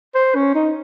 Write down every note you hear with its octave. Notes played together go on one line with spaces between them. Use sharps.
C5
C#4
D#4